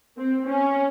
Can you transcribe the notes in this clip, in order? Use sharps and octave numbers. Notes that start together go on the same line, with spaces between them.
C4
C#4